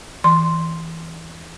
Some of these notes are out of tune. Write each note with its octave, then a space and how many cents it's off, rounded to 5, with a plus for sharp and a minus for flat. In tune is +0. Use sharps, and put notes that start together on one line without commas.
E3 -10 C6 +0